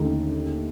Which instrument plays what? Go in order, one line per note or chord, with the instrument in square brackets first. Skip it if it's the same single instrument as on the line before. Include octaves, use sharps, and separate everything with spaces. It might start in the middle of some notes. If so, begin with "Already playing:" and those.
Already playing: [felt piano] D#2 D3 A3 D#4 A4